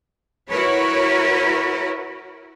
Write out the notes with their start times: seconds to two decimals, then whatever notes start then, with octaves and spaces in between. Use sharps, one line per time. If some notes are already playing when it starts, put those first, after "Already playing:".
0.50 E4 F#4 A#4 B4 C#5